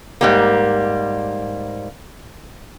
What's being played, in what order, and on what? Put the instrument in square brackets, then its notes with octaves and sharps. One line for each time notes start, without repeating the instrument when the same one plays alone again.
[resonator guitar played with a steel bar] G#2 G3 A#3